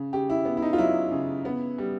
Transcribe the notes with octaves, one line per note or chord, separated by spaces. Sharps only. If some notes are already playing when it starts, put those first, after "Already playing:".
Already playing: C#3
C#3 G4
E4
B3
E4
D#4
F4
F#3 E4
C#3
B3
G3